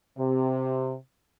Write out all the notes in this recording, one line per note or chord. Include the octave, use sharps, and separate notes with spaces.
C3